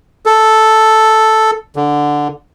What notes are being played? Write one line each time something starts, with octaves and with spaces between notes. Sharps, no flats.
A4
D3